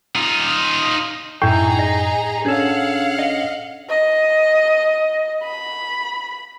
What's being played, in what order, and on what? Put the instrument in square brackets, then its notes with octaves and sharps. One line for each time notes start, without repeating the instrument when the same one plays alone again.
[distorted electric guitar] D#4 F4
[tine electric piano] F#2 [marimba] A2 [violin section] D#4 G#4 A#5 [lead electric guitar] E4 G5
[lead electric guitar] D#5
[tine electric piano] C#4 D4 C#5 [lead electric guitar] G#4 A4 [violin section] F5 F#5
[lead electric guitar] D#5
[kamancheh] D#5
B5